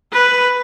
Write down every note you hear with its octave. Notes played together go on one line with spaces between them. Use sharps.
B4